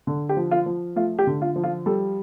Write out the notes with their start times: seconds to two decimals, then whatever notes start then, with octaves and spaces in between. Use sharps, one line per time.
0.07 D3
0.29 G4
0.37 F3
0.51 F4
0.66 F3
0.96 A3 F4
1.19 G4
1.27 D3
1.42 F4
1.56 F3
1.63 F4
1.86 G3 A4